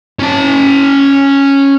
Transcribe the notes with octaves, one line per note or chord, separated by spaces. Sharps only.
C#4 A5